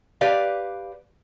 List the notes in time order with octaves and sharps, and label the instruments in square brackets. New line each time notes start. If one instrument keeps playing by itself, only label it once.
[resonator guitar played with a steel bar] G4 B4 D5 F5